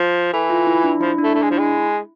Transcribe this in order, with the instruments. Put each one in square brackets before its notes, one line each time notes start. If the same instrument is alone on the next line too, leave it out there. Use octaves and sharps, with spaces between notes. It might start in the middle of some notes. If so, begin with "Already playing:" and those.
Already playing: [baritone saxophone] F3
[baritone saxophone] E3 [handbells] A4
[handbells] F4
E4
D4
[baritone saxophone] F3 [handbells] E4
[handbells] D4
[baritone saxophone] A3
[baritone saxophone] A3 [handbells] D4
[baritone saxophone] G#3
[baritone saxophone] F3 [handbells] E4
[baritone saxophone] G#3